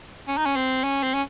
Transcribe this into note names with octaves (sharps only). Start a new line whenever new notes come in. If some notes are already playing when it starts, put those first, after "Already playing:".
C#4
D#4
C#4
C4
C#4
C4
C#4